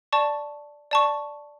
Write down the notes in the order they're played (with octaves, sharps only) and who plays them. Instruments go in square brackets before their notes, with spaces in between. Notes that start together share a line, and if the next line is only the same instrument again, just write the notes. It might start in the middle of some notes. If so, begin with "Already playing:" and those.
[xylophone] D5 A5 C#6
D5 A5 C#6